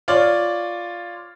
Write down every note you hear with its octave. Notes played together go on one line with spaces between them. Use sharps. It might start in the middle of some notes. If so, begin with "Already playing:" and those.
F4 C#5 D5